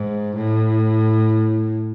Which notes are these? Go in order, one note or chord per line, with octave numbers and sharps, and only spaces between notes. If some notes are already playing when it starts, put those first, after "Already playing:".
Already playing: G#2
A2